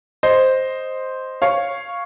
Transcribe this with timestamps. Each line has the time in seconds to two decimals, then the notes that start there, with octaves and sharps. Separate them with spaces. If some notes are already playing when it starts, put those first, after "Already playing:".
0.23 C5 D#5
1.42 C#5 F5